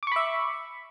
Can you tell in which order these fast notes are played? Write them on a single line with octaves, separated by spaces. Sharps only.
D6 C#6 B5 E5